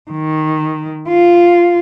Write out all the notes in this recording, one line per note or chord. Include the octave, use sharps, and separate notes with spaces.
D#3
F4